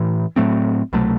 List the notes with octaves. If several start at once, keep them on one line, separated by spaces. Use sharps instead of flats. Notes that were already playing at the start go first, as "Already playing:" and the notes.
Already playing: A2 E3
A2 F#3 A3 C4
C2 B2 F#3 A3